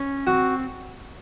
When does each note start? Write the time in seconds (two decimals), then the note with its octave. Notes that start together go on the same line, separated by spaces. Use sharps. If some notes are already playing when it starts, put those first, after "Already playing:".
Already playing: C#4
0.27 C4 F#4